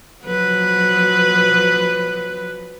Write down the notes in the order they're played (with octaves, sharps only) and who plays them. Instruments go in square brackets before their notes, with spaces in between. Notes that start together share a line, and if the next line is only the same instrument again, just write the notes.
[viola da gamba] F3 F#3 B4